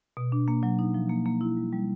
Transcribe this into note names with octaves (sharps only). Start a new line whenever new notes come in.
B2
D4
A#3
F#3
D#4
F3
A#3
A#3
E4
G3
G3